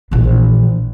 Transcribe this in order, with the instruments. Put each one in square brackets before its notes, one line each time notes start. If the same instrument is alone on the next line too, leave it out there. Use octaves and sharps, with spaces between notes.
[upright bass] A#1 E3